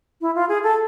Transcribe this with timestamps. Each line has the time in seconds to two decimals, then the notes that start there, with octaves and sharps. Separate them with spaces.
0.21 E4
0.35 F4
0.49 G#4
0.63 A4